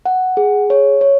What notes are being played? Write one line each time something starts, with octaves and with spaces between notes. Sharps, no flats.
F#5
G#4
C#5
C#5